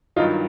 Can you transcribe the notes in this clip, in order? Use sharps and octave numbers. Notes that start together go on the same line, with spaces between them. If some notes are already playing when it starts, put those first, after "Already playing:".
G2 D#3 F#3 D#4 F4